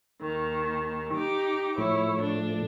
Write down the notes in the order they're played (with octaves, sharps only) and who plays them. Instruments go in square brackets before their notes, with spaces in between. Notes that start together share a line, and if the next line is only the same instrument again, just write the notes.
[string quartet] D#2 D#3
D#4 G4 D6
[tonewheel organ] A2 F3 A3 [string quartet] E4 C#5
[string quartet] D4